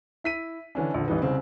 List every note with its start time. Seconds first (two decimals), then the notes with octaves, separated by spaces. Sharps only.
0.24 E4 B6 D#7
0.75 D3 E3 C#4 D4
0.94 A#1 D3
1.07 A1 E3 G3 D#4 B4
1.22 C2 C#3 C4